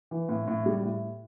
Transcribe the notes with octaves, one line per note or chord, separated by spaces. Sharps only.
E3
A2
A2
G3
A2